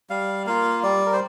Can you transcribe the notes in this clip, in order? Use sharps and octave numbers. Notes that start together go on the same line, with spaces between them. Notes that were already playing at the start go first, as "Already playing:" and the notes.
G3 F5
A#3 F4 F5
G3 D5
A#4
C5